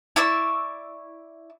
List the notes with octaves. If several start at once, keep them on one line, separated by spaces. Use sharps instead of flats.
E4 D5 C#6 E6